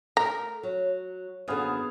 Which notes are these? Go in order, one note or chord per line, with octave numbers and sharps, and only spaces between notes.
A3 A#4 A#5
F#3
F#2 D3 B3 G#4 F5